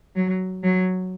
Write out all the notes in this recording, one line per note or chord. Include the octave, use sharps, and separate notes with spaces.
F#3
F#3